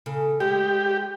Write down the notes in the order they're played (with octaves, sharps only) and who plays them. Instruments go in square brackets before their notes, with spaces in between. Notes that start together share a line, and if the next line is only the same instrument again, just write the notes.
[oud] C#3 A4
[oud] G#3 [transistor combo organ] G4